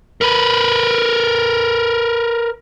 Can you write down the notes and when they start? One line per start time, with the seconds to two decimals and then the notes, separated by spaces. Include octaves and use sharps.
0.21 A#4 B4